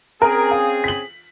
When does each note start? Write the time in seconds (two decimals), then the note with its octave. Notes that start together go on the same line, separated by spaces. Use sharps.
0.22 C4 C#4 G#4 A#4
0.51 F5
0.84 B6 F#7